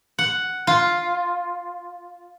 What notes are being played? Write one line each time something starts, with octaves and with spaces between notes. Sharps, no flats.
F#5
F4